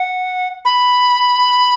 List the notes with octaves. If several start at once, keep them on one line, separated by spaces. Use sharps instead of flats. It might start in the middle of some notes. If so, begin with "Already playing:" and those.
Already playing: F#5
B5